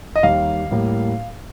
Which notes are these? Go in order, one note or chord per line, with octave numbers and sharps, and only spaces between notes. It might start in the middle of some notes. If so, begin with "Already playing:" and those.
D#5
D#2 D#3 G3 F5
A2 G3 A#3